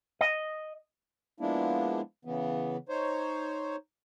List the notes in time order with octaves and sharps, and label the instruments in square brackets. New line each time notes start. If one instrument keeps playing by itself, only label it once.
[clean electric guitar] D#5
[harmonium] F3 G#3 A#3 B3 D4 E4
C#3 E3 B3
D#4 C5 C#5